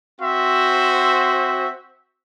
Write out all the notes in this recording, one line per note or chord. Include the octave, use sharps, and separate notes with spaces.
C4 F#4 C5 E5